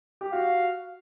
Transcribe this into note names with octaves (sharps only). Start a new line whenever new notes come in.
G4
F#4 F5